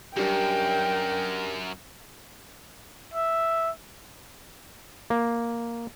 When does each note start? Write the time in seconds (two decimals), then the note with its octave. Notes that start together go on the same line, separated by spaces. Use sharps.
0.17 F#2 G3 D4 A#4 G5
3.14 E5
5.10 A#3